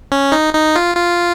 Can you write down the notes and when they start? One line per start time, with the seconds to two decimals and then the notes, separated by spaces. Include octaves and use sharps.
0.12 C#4
0.32 D#4
0.54 D#4
0.76 F4
0.96 F4